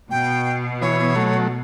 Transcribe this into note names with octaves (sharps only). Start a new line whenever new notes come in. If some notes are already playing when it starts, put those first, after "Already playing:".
B2 G5
E3 B3 C#5
F#3 A3